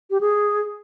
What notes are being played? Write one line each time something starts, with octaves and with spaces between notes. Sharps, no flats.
G4
G#4